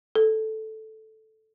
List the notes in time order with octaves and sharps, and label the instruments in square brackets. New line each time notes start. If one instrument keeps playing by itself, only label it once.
[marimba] A4